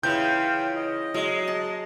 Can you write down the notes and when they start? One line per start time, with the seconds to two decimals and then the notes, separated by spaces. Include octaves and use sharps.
0.03 C#3 E3 F4 G5 C6 G6
0.76 D#5
1.14 F#3 G#3
1.48 A5